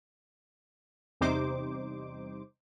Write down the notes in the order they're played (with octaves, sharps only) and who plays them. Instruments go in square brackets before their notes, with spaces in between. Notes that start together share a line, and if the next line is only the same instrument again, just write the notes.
[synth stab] E2 C3 G3 D#4 C5 D6